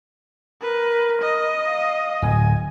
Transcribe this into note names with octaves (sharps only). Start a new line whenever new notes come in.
A#4 B4
D#5
F5
D1 G#5